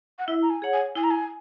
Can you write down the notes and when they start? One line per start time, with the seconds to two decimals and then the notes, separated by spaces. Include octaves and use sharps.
0.19 F#5
0.28 E4 E5
0.42 A#5
0.50 G#5
0.62 G#4 C#5 F#5
0.73 G#5
0.95 E4 G#5
1.04 A#5
1.11 G#5